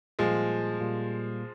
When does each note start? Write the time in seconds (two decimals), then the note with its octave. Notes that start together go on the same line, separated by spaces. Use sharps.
0.19 A#2 F3 G3 G#3 A#3 F4
0.80 A#2 G3 A#3 F4